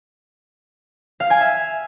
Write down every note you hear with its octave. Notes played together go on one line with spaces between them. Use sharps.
F5
G#5
E5